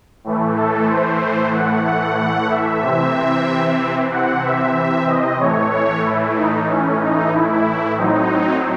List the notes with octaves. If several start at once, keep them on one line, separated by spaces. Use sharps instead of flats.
A2 E3 A3
A4
C5
F#5
F#5
F#5
E5
C3 E3 C4
F#5
E5
E5
D#5
A2 E3 A3 C#5
C#5
E4
D#4
C#4
D#4
E4
A2 F#3 C4 D#4